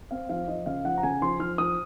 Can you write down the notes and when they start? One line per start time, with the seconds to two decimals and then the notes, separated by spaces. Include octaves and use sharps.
0.11 C4 F5
0.29 F3 F5
0.48 F3 D#5
0.66 C#3 F5
0.84 F3 F#5
0.98 A#5
1.03 C#3 G#5
1.22 F3 C6
1.40 F3 F6
1.58 F3 D#6